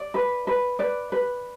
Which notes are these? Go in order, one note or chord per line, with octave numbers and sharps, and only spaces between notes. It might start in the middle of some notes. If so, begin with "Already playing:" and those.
Already playing: D5
B4
B4
B4 D5
B4